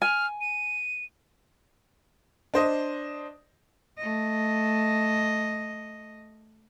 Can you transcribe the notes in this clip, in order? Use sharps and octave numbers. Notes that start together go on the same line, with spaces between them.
G#5 F6
D#7
D4 C5 D#5
A3 D#5